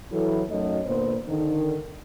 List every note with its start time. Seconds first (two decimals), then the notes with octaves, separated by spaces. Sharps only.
0.12 E3 F#3 E4 A4
0.49 F#2 F#3 A3 D#4 D#5
0.85 A#2 D3 B3 C5
1.28 D3 D#3